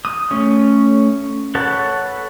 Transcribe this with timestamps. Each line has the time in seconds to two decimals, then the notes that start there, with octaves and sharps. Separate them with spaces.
0.05 D#6
0.31 A3 C#4 C#5
1.55 A4 B4 C#5 F#5 A5